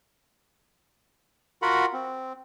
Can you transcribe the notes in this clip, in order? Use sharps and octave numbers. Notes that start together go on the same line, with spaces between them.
F4 F#4 A#4 F#5 B5
C4